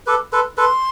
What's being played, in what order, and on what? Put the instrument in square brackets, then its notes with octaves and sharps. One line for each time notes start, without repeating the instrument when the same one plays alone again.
[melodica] A4 B4 [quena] D6
[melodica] A4 B4 [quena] C6
[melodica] A4 B4 [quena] C6